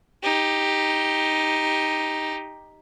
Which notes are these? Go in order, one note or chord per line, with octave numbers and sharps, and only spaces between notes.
D#4 G4